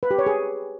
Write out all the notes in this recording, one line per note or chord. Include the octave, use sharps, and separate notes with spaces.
B4
G4
C#5
G#4